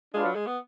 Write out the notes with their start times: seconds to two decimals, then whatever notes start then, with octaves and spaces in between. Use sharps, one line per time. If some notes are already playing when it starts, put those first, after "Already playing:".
0.14 G#3 D4 F4 B4 F5
0.25 F#3
0.35 G#3
0.47 B3